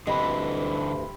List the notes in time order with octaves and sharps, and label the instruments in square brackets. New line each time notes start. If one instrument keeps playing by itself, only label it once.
[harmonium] D2 G2 [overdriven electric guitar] D3 E3 [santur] G3 C4 B5 [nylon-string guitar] D#5